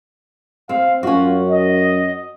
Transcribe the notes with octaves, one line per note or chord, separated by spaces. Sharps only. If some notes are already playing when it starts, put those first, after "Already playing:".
C4 F5
F#2 C#4 F4 F#4
D#5